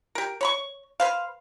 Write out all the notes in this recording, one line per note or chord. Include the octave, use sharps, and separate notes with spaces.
G4 A#4
C#5 B5 C#6
B4 C5 F5